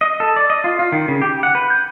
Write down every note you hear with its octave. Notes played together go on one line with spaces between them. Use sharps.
D#5
A4
D5
D#5
F4
F4
D#3
C#3
G4
F#5
B4
G6